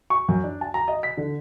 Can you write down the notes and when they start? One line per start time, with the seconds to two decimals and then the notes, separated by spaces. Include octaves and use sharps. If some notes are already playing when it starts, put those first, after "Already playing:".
0.10 C#6
0.28 F#2
0.44 D4
0.61 A5
0.74 A#5
0.88 D#5
1.03 B6
1.17 D3